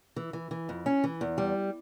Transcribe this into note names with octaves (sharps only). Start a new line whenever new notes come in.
E3
E3
E3
F2
C#4
E3
E2
G3